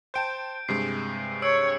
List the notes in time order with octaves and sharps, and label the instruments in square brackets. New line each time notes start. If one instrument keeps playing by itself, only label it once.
[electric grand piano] C5 G5 A5 [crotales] G6 D7
[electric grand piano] G2 C3 G#3 [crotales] C7
[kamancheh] C#5 [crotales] E6 C7 D7